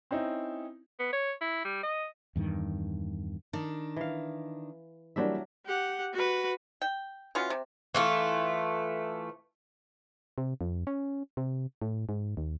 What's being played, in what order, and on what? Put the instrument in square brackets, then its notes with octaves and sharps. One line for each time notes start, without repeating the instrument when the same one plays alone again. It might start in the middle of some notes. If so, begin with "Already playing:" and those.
[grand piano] C4 C#4 D#4 E4
[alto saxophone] B3
C#5
E4
G3
D#5
[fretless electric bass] E2 G2 D#3
[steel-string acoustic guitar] D#3 D4
[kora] E3 F5
[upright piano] E3 G3 A#3 [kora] F#3 D4 E5
[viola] G4 F#5
F#4 B4
[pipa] G5
E3 F#3 C#4 F4
C3
[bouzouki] E3 A3 F4
[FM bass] C3
F2
C#4
C3
A2
G#2
D#2